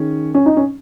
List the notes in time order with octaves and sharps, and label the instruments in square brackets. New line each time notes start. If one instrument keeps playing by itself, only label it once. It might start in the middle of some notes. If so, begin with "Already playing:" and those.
Already playing: [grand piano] D#3 C#4 G#4
[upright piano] C#4
D#4
C#4